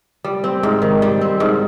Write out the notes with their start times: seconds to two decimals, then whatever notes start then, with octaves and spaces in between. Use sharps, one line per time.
0.24 G3
0.44 C4
0.63 G#2
0.82 D#3
1.02 G3
1.21 C4
1.40 G#2